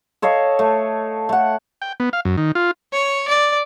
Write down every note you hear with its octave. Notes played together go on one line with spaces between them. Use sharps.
A4 C#5 D#5 F5
A3
A3 F#5
G5
B3
F5
F#2
D#3
F4
C#5
D5